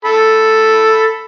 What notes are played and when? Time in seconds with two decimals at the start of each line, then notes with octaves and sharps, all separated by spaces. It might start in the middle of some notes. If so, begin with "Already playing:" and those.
0.05 A4 B5